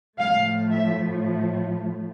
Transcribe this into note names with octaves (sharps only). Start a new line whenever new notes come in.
A2 F3 A3 F5
E5